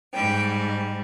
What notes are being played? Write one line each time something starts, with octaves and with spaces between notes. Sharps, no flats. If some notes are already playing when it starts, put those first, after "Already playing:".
G#2 G3 G5